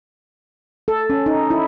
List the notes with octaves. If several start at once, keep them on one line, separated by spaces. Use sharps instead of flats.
A4
C#4
D#4
E4